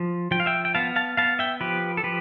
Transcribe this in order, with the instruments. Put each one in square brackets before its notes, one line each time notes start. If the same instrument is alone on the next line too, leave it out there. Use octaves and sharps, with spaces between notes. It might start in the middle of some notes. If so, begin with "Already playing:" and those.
Already playing: [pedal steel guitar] F3
F3 G5
F5
E5 G5
G5
B3 F5 A5
F5 A5
B3 F5 A5
E5 G5
F3 G4 B4
A4
F3 G4 B4